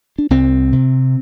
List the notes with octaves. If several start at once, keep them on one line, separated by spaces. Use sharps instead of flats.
D4
C2 C4
C3